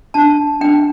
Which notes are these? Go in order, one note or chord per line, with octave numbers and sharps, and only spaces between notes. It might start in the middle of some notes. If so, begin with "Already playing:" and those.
D4 A5
D4 G5